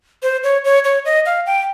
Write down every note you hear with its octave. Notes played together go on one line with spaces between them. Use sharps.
C5
C#5
C#5
C#5
D#5
F5
G5